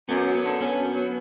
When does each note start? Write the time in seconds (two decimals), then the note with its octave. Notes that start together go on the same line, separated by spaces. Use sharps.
0.09 F#2 B3
0.26 F#3
0.35 B3
0.44 D3
0.61 B3 C#4
0.77 F#2
0.95 F#3